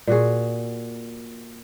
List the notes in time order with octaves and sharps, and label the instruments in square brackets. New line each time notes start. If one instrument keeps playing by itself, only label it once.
[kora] A#2 F#4 G#4